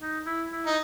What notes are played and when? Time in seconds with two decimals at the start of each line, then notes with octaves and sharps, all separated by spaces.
0.02 D#4
0.26 E4
0.52 E4
0.66 D#4